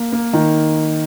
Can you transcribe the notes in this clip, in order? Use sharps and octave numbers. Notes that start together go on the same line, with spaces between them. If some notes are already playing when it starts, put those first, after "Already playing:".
Already playing: A#3
A#3
D#3